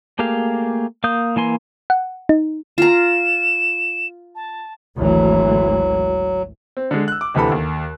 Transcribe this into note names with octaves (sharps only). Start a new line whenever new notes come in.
A3 A#3 G4 G#4 F5
A#3 F5 D#6 G6
E3 A#3 G#5 C6
F#5
D#4
F4 A#5 E7
A5
G#1 D2 E3 F#3
C4
D3 G#3
E6 F#6
D6
D2 C3 E3 A4 B5
D#2